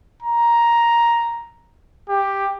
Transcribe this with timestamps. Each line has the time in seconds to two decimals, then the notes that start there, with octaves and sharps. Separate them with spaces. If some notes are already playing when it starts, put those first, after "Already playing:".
0.22 A#5
2.09 G4